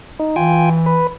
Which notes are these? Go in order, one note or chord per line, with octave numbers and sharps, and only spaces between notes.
D#4
E3 F4 G5 G#5
B4